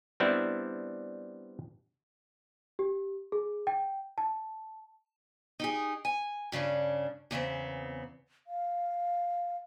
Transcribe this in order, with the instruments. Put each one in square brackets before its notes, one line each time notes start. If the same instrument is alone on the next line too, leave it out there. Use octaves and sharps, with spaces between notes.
[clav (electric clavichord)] G3 B3 C4 D4 E4
[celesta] G4
G#4
G5
A5
[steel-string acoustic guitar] D#4 G4 G#4
G#5
G2 C#3 C#4 D4
E2 C#3 B3 C4
[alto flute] F5